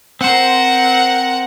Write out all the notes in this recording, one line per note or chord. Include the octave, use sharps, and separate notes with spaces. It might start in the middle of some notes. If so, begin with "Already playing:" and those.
C4 A#4 C5 F#5